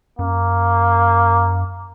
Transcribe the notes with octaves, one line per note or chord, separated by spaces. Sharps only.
F#2 A#3